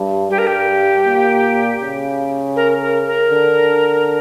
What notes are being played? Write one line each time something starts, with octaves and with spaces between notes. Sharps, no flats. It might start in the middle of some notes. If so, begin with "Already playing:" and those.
Already playing: G2
G2 G4
A#4
G4
A#2
C#3
A#4
A#4
A#4
D3